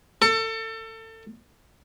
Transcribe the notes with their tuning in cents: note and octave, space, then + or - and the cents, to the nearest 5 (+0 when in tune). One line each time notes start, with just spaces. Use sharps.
A4 +30